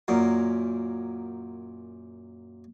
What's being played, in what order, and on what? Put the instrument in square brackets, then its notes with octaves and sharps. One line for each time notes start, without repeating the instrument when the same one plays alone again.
[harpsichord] F#2 A#2